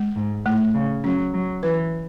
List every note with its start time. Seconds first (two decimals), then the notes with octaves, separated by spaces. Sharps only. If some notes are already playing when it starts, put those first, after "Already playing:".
Already playing: G#3
0.16 G#2
0.45 A2 A3
0.74 C#3
1.04 F#3 C#4
1.34 F#3
1.63 E3 B4